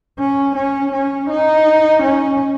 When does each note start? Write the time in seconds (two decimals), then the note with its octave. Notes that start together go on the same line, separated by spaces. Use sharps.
0.19 C#4
0.56 C#4
0.92 C#4
1.29 D#4
2.02 C#4